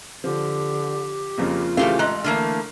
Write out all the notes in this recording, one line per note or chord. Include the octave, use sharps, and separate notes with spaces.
D3 F3 G4
F2 C#3 A#3 F4
C#3 E3 F3 A3 G4 F5
A1 G#3 A#5 F#6
D3 E3 A3 A#3 F6